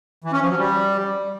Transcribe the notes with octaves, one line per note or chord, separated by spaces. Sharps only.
E3
C#4
F3
F#3
G3